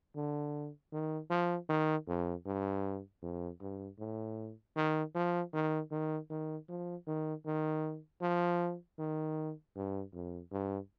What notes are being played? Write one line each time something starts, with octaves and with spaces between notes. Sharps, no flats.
D3
D#3
F3
D#3
F2
G2
F2
G2
A2
D#3
F3
D#3
D#3
D#3
F3
D#3
D#3
F3
D#3
G2
F2
G2